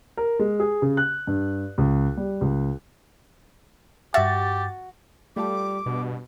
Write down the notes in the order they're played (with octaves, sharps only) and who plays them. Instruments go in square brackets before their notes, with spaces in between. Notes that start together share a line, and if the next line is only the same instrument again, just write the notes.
[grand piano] A#4
G#3
G#4
C#3
F#6
G2
C#2
G3
C#2
[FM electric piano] G2 A6 [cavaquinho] F#4 [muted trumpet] G4 [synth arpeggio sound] E5
[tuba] G3 [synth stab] A3 F4 A4 [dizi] D6
[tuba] G2 [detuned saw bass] B2